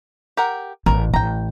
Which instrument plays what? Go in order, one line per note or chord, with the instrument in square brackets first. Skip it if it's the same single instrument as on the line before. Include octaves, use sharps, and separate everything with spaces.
[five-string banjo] G4 A#4 F#5
[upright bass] A1 [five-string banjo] A#4
[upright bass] A1 [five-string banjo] G5 A#5